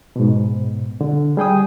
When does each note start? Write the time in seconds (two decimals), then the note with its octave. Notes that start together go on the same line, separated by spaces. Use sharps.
0.16 G#2 B2
1.01 D3
1.37 G3 G#4 G5 D#6